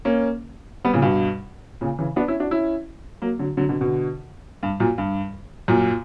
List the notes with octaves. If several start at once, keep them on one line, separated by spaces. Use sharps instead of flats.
A#3 C#4
G3 B3
A#2 C#3
G2 B2
A#2 C#3
C#3 E3
B3 D4
C#4 E4
D4 F#4
C#4 E4
F#3 A#3
D3 F#3
D3 F#3
B2 D3
B2 D3
G2
F#2 A#2
G2
F#2 A#2